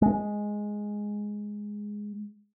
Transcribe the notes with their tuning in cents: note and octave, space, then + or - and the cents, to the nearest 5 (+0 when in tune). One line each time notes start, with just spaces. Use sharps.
G#3 +0